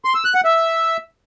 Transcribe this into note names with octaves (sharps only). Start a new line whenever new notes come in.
C6
E6
F#6
F#5
E5